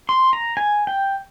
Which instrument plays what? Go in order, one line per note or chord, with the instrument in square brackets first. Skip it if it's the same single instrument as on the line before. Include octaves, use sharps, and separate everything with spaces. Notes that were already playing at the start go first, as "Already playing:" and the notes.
[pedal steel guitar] C6
A#5
G#5
G5